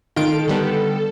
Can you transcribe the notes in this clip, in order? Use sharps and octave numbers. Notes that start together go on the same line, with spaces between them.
D#3 F4 A4 D7
D3 G3 B3